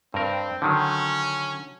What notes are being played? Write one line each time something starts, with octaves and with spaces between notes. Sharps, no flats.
G2 C4 A#4
D3 D#3 F#3 C#4